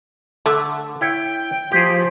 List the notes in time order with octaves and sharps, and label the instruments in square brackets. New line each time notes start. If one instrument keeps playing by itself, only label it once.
[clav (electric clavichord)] D3 [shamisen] A3
[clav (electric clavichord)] E4 C#5 [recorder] G5
[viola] F3 [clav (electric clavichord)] G4 G#4